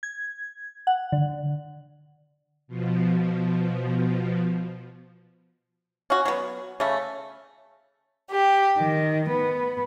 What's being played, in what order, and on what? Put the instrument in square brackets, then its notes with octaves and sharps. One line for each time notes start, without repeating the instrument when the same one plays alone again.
[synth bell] G#6
F#5
D3
[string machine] B2 F3
[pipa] C#4 F#4
F#3 B3
C#3 A3
[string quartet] G4
D#3
B3